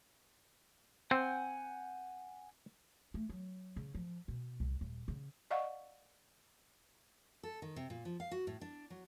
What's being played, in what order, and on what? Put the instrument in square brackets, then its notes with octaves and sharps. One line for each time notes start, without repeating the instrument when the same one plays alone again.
[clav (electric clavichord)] C4 [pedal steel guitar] F#5 G#5 G6
[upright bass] A3
F#3
C#3
F3
B2
C2
D#1
C#3
[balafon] D5 D#5 F5 F#5 C#6
[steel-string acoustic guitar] A4
D#3
C3
A#2
F3
F5
F#4
A2
D4
F#3